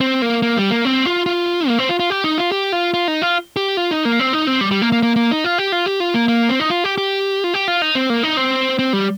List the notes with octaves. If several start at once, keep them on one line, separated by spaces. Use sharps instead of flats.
C4
A#3
A#3
G3
A#3
C4
F4
F4
A#3
C4
F4
F4
G4
D#4
F4
G4
F4
F4
D#4
F4
G4
F4
D#4
A#3
C4
D#4
C4
G3
G3
A#3
A#3
A#3
A#3
D#4
F4
G4
F4
G4
F4
A#3
A#3
C4
D#4
F4
G4
G4
F4
G4
F4
D#4
C4
A#3
D#4
C4
C4
G3